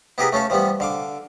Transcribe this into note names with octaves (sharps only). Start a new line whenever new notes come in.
B3 E4 G4 G#4 A#4 B4
A3 C#4 A4 F5
E3 F3 G3 B3
D3 F5 D6